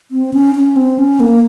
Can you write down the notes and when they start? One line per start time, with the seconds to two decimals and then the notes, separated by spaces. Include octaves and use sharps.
0.11 C4
0.34 C#4
0.55 C#4
0.76 C4
0.98 C#4
1.20 A#3